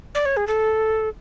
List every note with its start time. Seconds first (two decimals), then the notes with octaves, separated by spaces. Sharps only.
0.15 D5
0.26 C#5
0.37 G#4
0.47 A4